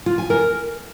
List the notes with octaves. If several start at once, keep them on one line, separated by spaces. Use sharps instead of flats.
F4
G#5
A#4